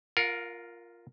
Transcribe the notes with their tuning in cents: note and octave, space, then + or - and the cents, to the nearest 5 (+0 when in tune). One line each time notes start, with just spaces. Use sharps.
F4 +0 A#4 +0 F#5 -45